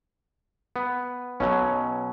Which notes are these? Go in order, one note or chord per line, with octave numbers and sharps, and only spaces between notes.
B3
B1 B2 F#3 C#4